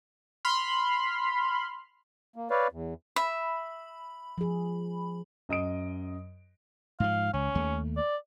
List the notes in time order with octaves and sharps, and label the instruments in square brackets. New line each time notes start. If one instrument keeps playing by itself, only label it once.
[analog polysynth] B5 C6 F6
[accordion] A#3
B4 C#5 D5 F5
E2
[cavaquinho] E5 [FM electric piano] B5
[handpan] F3 G#4
[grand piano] F#2 D#5 D#6 D7
[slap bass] G#2 F3 [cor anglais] F5
[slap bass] C#2 [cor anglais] C#4
[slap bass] D#2 A3
[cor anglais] D5